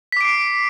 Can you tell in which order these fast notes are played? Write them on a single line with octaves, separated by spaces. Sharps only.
B6 D6 D7 C7